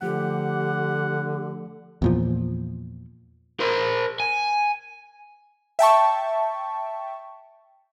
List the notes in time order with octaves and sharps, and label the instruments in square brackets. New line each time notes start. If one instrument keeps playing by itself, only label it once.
[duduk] D3 [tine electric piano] F3 A3 [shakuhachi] G4 [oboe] F#5
[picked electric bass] E2 A#2 F3
[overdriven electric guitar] A#4 C5
G#5
[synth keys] E5 G5 A5 C#6